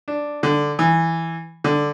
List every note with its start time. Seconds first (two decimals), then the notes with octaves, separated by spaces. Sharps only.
0.08 D4
0.43 D3
0.79 E3
1.64 D3